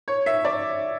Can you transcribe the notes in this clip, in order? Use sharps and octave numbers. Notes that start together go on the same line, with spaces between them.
C#5
E5
D5